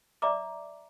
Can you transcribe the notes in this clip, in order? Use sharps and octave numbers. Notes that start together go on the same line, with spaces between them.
D5 E5 A#5 D6